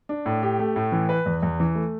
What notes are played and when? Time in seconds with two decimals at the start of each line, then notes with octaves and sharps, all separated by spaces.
0.09 D4
0.26 A2
0.42 G4
0.59 A3
0.76 A2
0.92 E3
1.09 B4
1.26 E2
1.42 E2
1.60 E3
1.75 A3